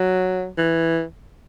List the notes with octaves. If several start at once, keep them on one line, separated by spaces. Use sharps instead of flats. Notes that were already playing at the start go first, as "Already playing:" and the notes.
Already playing: F#3
E3